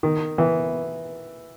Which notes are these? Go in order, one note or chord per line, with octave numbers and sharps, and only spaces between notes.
D#3
E3